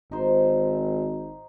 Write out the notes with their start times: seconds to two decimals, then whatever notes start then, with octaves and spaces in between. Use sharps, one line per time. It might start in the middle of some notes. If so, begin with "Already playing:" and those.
0.12 G#1 D#4 C5